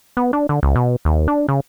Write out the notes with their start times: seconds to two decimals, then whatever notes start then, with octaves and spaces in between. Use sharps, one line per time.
0.17 B3
0.33 D4
0.49 D3
0.63 C#2
0.75 B2
1.05 D#2
1.28 D4
1.48 C#3